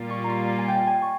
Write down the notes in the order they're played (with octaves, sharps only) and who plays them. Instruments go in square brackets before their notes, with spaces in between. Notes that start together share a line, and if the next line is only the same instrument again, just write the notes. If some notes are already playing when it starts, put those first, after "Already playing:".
Already playing: [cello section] A#2 G3 A#3 F4
[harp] C#6
A#5
C6
G#5
G5
G#5
C#6